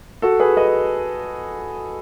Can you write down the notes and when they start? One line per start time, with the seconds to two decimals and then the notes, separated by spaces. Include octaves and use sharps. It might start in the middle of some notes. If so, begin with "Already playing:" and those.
0.22 F#4 A4
0.40 G#4 B4
0.57 B4 D#5